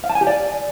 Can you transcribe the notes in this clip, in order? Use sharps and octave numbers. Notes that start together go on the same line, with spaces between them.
F5
A5
G#5
G4
D5